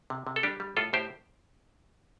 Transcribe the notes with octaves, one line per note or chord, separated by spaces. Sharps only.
C3
C3
A4
G3 D4 G4
G3
A2 F4 A4
A2 G4 C5